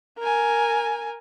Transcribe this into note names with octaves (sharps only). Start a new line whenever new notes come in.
A#4 G#5